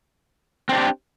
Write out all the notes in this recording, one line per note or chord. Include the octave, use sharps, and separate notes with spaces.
C4 D4 G4